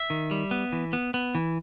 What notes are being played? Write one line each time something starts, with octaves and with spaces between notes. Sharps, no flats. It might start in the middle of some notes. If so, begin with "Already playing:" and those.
Already playing: E5
D#3
G3
B3
E3
B3
B3
E3